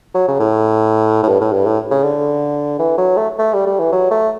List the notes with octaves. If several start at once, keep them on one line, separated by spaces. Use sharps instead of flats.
F#3
C#3
A2
A2
G2
A2
G2
A2
C#3
D3
E3
F#3
A3
A3
G3
G3
E3
F#3
A3